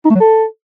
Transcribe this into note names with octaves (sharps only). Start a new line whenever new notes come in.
D#4
A3
F#3
A4